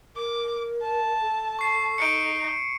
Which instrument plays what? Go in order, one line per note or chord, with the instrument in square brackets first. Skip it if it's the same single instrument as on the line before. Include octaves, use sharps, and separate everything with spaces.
[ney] A#4 [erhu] D6
[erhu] A5
[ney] A4
[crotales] C#6 C7
[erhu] D#4 [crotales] C#7 D7